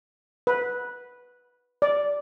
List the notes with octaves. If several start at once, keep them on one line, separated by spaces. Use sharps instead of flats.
B4
D5